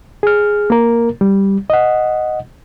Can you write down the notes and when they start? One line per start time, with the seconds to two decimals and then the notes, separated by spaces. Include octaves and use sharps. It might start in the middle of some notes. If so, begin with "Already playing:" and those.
0.23 G#4 F6
0.70 A#3 A#4
1.21 G3
1.70 D#5 F#5